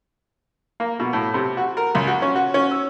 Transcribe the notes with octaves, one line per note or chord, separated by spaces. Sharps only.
A#3
B2
A2
C3
F#4
A#4
C#2
F#4
C#4
F#4
C#4
E6